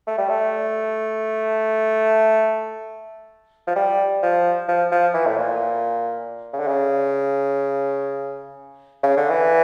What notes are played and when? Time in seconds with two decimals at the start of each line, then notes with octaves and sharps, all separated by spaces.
0.07 A3
0.18 G3
0.29 A3
3.67 F3
3.76 G3
4.23 F3
4.68 F3
4.92 F3
5.14 E3
5.27 A2
5.37 A#2
6.53 C#3
6.60 D3
6.68 C#3
9.03 C#3
9.17 D3
9.30 E3